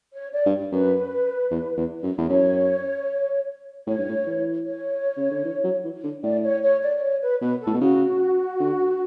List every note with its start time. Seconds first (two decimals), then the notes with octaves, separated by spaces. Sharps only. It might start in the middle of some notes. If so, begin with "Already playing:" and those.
0.13 C#5
0.33 D5
0.46 G2
0.72 F#2 B4
1.51 E2
1.77 E2
2.03 F#2
2.18 E2
2.30 F#2 C#5
3.87 A2 C#5
3.98 G2
4.09 A2
4.27 E3
4.66 C#5
5.17 C#3
5.31 D3
5.45 E3
5.64 F#3
5.84 E3
6.04 D3
6.23 A2 D5
6.44 C#5
6.63 C#5
6.83 D5
6.97 D5
7.02 C#5
7.22 B4
7.41 B2 B4
7.62 A4
7.67 A2
7.74 B2
7.81 C#3 F#4
8.60 D3